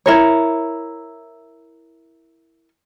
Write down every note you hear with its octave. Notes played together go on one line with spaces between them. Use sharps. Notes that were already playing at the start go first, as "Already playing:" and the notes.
E4 A#4 C#5